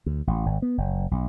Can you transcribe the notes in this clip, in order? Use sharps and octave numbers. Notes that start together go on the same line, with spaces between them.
D2
A1
G#1
B3
F#1
B1